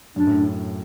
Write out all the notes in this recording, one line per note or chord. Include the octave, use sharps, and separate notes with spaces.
F#2 D4
A2